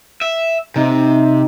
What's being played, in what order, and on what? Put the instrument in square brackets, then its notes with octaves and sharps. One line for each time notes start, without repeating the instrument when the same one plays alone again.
[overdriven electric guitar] E5
[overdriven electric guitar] C3 [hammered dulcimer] D#4